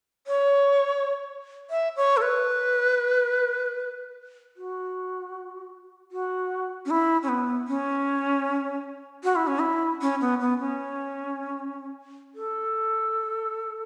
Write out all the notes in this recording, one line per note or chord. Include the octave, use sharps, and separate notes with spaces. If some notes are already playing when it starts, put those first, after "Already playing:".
C#5
E5
C#5
A4
B4
F#4
F#4
C#4
E4
C#4
B3
C#4
F#4
E4
C#4
E4
C#4
B3
B3
C#4
A4